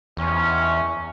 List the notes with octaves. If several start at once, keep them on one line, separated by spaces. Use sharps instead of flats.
G#1 E2 C3 C#4